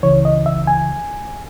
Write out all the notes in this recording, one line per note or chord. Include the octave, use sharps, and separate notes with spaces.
C#2 C#3 E3 C#5
D#5
E5
G#5